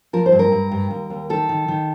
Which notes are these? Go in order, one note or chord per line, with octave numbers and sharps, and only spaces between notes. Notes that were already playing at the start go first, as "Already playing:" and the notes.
F3 A#4
C5
G2
A#4
G2
G2
D#2
D#2
D#3 A4
D#3
D#3